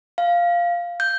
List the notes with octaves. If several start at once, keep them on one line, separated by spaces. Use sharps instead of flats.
F5
G6